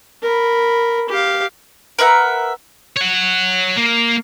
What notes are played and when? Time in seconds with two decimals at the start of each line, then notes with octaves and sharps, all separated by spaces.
0.23 A#4 B5
1.09 G4 F5
1.99 A#4 B4 E5 F#5
2.97 C#5 F#5
3.77 A#3